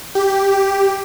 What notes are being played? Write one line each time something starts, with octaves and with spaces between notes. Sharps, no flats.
G4